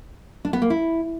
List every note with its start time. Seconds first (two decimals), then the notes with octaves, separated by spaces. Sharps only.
0.45 D4
0.53 B3
0.62 A#3
0.70 E4